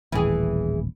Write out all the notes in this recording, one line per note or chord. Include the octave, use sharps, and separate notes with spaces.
D#1 A1 E3 G#4